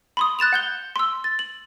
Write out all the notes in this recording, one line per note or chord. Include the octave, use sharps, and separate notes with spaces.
B5 C6 D#6
F#6 A6 E7 F7
F#5 G6 G7
C6 E6
A6
F#7